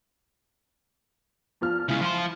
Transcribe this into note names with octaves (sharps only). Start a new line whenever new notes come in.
E2 F3 F6
C#3 G#3 E4
F3 C6